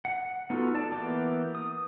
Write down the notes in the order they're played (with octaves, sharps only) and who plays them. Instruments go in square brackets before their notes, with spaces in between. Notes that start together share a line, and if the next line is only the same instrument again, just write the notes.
[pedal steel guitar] F#5
B3 D#4 F4 F#4 A4
D5 A5
E3 A#3 B3 G4 D6
D#6